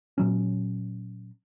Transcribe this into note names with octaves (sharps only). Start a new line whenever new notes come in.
A#2 F#3 C#4